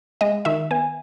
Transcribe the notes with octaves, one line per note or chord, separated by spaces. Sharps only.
G#3 D#5
D#3 E5
B3 G#5